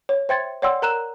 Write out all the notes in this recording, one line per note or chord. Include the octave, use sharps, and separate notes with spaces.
C#5
C5 E5 G5 C6 G#6 A6
C#5 D5 F#5 G5 C6 E6
A#4 A#5 F#6 E7